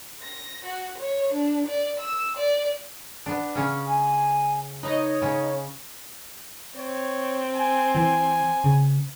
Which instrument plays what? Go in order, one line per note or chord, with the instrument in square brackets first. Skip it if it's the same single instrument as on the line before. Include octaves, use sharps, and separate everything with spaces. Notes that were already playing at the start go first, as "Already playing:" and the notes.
[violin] A#6
F#4
C#5
D4
D5
E6
D5
[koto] B3 D4
[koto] C#3 C#4 C#5 [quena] F6
[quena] G#5
[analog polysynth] D#4 D#5 [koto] B4 [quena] C#5
[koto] C#3 C#4
[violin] C4 [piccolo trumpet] C#5
[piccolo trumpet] G#5
[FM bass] E3 [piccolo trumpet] G#5
[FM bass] C#3